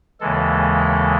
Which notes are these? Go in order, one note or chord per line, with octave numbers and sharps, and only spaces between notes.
D#2 C#3 E3 G#3 A4